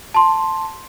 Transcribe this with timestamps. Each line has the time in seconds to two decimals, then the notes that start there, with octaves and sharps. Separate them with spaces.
0.14 A5 C6